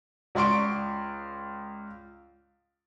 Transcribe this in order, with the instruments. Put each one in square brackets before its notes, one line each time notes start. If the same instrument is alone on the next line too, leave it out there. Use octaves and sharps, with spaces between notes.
[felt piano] C#2 D5 C6 C#6 D7